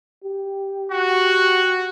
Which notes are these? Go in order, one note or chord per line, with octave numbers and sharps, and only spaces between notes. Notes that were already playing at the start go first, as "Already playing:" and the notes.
G4
F#4